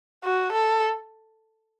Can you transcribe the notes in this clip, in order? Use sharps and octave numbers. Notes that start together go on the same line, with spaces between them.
F#4
A4